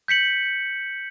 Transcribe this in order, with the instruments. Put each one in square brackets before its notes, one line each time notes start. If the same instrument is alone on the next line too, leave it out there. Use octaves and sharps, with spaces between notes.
[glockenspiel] G6 B6 C#7 F#7